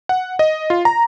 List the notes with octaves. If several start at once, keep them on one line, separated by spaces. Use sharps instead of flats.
F#5
D#5
F4
A#5